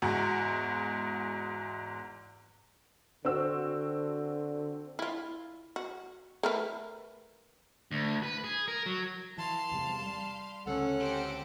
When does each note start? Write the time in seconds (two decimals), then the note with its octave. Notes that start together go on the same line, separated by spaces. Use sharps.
0.02 E2 G#2 F#4
3.25 D3 C4 F#4 E6
4.99 E4 F4
5.76 F#4
6.43 A3 A#4 B4
7.92 D2
8.23 B4
8.44 G#4
8.68 A#4
8.86 F#3
9.38 E3 F5 A5 C6
9.71 E2 C3 G3
10.06 G3
10.66 D2 C#3 C#4 A4 F#5
10.99 C4 G4